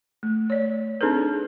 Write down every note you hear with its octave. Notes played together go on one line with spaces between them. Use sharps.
A3
C#5 D5
C4 D4 D#4 G#4 A4 B4